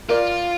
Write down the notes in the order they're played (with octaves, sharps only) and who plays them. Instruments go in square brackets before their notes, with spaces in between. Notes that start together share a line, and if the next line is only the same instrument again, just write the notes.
[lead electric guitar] F4 [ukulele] A#4 D5